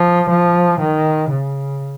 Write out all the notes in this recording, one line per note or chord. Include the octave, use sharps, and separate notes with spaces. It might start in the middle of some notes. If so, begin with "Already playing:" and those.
Already playing: F3
F3
D#3
C#3